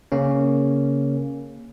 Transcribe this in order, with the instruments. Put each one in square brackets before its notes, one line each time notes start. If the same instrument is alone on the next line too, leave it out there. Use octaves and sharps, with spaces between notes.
[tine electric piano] C#3 A#3 C#4